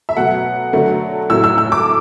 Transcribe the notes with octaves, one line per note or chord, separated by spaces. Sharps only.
E5
B2 F#3 A3 F#5
D3 F#3 A3
A2 F#3 A3 E6
E6
E6
D6